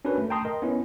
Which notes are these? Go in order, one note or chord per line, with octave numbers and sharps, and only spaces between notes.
C#4 D4 F#4 A#4 B4
A3
G5 A5 A#5 C6 D#6
A#4 D#5
B3 C#4 E4